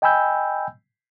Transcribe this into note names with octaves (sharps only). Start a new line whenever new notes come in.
D#5 G5 G#5 B5 E6 G6